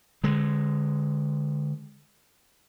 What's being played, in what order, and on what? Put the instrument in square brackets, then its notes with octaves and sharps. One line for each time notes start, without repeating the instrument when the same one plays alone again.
[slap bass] D3 G#3